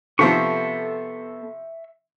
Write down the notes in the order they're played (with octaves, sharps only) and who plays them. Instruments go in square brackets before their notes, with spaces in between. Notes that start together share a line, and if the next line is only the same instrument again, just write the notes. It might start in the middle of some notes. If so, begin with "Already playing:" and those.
[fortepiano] C3 F3 [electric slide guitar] B3 A4 [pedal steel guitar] E5 C#6